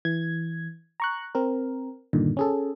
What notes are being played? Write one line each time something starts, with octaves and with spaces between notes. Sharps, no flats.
E3 G#6
A#5 C#6 F#6
C4 A#4
G2 A#2 D3 D#3
C#4 G#4 A4